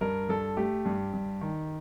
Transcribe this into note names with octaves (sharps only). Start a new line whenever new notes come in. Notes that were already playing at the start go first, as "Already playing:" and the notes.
G2 A#4
G2 A4
A3 G4
G2
G2
D#3